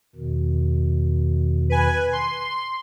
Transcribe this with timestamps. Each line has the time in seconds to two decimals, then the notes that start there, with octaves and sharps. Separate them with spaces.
0.16 E2 B2 D#3
1.70 B4 G#5
2.13 C6